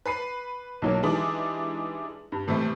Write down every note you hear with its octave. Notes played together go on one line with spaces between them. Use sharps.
B4 B5 C7 D#7
B1 F#3 A#3
E3 G3 G#3 D4 D#4
G2
A2 C3 E3 G3 A3